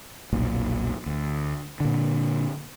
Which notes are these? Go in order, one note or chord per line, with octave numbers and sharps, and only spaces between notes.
F1 B1 A#2
D2
A#2 D3